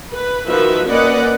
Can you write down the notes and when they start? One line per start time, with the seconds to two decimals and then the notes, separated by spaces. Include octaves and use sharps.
0.12 B4
0.48 D#3 F3 F#4 B4 E5
0.88 A#3 C#4 B4 D5 D#5 F#5